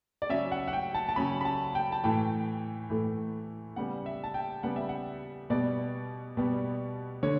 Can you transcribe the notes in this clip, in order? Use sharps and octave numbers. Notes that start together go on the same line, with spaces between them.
D5
C#3 F#3 C#4 E5
F#5
F#5
G5
A5
A5
C#3 F#3 C#4 B5
B5
A5
G5
A5
A2 E3 A3 G5
A2 E3 A3
C#3 G3 B3 F#5
E5
A5
G5
C#3 G3 B3 F#5
E5
F#5
B2 G3 B3 D5
B2 G3 B3
D3 C#5